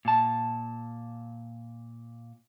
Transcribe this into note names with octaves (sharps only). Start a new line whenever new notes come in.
A#2 A5